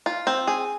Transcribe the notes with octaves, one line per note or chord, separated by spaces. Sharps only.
F4
C4
G#4